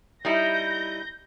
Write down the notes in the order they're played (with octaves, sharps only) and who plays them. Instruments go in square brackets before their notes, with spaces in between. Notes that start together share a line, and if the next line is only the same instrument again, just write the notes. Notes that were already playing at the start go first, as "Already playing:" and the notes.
[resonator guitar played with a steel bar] G3 D#4 E4 [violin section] G6 A#6